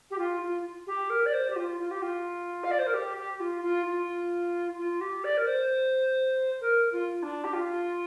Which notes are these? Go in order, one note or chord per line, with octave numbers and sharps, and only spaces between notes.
G4
F4
F4
G4
A#4
D5
C5
G4
F4
F4
G4
F4
F5
D5
C5
A#4
G4
G4
F4
F4
F4
F4
G4
D5
A#4
C5
A#4
F4
D4
G4
F4